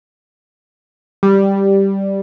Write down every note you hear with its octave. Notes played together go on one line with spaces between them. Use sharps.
G3